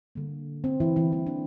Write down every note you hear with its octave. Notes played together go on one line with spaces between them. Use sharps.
D3 G3 A#3
C4
E3 E4
E3 E4
E3 G3 A#3 E4
D4